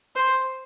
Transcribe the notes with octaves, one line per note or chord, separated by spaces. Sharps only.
C5